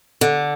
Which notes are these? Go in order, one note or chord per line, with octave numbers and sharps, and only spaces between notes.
D3